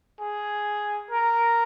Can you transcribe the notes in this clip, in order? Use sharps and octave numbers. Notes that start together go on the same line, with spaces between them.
G#4
A#4